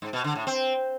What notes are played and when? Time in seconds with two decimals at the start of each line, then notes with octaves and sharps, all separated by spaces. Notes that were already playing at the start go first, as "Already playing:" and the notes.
0.02 G#2
0.13 B2
0.24 D3
0.36 A2
0.47 C4